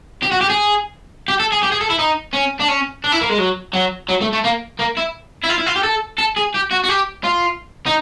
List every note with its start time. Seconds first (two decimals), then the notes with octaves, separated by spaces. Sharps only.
0.23 G4
0.32 F#4
0.41 G4
0.50 G#4
1.28 G4
1.40 A4
1.52 G#4
1.63 G4
1.72 G#4
1.81 A4
1.90 E4
1.99 D#4
2.33 C#4
2.60 D4
2.69 C#4
3.04 D4
3.12 E4
3.21 A#3
3.30 G#3
3.38 F#3
3.74 F#3
4.09 F#3
4.21 A3
4.33 A3
4.44 A#3
4.79 A#3
4.97 E4
5.44 E4
5.49 F4
5.58 E4
5.67 F4
5.76 G4
5.84 A4
6.19 A4
6.37 G#4
6.55 G4
6.71 F#4
6.84 F#4
6.89 G4
7.24 F4
7.86 D#4